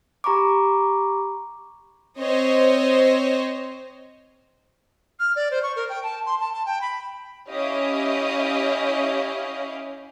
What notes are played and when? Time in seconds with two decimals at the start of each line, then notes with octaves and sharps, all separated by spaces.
0.24 G4 A#5 B5 C#6 D6
2.18 C4 C5 C#5 D#5
5.19 F6
5.36 D5
5.51 C5
5.63 C#6
5.76 A#4
5.89 G5
6.03 A5
6.26 C6
6.40 A5
6.54 A5
6.66 G5
6.81 B5
7.49 C#4 E4 G4 D#5 F5